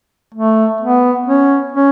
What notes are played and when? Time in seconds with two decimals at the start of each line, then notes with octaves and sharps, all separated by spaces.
0.34 A3
0.81 B3
1.26 C#4
1.72 C#4